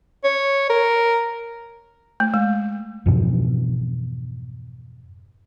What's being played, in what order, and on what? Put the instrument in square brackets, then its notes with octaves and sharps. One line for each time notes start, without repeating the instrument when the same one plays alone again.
[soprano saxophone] C#5
A#4
[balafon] A3
G#3
[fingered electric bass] F2 G#2 B2 E3